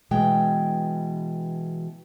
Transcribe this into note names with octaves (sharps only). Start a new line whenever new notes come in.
B2 E3 G#3 G5